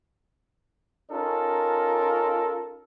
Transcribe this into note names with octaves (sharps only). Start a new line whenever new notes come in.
C#4 D#4 F4 A4 A#4